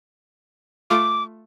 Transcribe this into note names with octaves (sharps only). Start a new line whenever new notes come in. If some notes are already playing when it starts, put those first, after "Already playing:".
A3 F4 D6